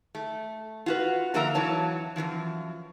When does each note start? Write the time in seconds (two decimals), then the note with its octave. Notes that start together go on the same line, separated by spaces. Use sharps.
0.15 A3
0.86 F4 F#4 B4
1.34 D3 F3 A#3 A#4 E5 A#5
1.55 F2 E3 F#3 C#5 A5
2.16 F#2 C3 E3 F3